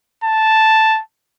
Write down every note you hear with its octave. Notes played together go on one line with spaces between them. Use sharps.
A5